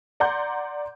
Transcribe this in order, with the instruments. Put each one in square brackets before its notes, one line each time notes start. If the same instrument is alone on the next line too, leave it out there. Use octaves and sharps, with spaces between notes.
[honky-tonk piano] D5 F#5 A#5 C6 G6